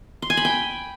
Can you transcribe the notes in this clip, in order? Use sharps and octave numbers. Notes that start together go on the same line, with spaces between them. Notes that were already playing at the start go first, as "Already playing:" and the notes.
C6
G#5
B5
G5